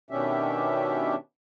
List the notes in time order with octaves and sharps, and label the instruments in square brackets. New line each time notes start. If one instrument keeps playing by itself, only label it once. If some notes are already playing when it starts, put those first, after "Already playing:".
[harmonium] B2 D#3 C#4 D4 G4 E5